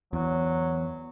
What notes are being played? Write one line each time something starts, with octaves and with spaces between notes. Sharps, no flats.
E2 F#3